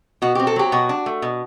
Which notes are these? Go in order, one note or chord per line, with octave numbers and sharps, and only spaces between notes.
B2 F#4
C4 G4
A4
F#3 G4
B2 F#4
D4
A3
B2